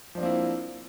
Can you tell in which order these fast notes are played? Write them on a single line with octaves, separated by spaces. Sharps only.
F3 D4 C4 A#3 E4